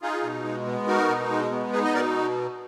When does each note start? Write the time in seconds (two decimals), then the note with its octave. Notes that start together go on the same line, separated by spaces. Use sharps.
0.02 D#4 F4 G#4
0.23 B2
0.44 G#3
0.66 B3
0.87 D#4 F#4 A#4
1.09 B2
1.30 G#3
1.51 B3
1.73 D#4 G#4 B4
1.84 D#5
1.94 B2 A#4 D5